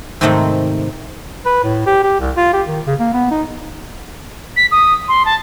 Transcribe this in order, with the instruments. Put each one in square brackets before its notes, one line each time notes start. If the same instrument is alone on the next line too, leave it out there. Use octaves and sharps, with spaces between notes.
[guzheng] G#2 C3 D#3 A3 C4 D#4
[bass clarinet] B4
A2
G4
G4
C2
F4
G4
D#3
C#3
A#3
B3
D#4
[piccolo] B6
D#6
C6
A5